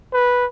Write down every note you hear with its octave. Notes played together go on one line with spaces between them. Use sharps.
B4